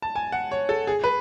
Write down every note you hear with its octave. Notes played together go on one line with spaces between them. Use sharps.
A5
G#5
F#5
C#5
A4
G#4
B4